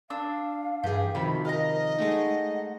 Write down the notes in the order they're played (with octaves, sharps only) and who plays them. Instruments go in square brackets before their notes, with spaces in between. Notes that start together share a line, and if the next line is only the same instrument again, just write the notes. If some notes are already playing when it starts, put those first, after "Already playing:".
[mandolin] D4 E6 [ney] F5
[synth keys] G2 E3 G#4 [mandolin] G4
[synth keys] C3 D#3 F3 [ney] F#4 [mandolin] B5
[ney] A#4 [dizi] D#5 [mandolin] F5 A#5
[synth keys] G#3 A3 D#4 [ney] F#5